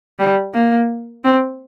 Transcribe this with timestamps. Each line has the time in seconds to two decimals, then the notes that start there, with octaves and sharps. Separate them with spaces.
0.19 G3
0.54 A#3
1.24 C4